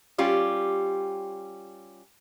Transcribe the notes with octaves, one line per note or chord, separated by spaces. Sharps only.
G3 C#4 F4 G4